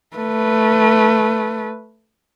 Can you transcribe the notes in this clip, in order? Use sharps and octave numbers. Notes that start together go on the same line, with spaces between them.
A3 B4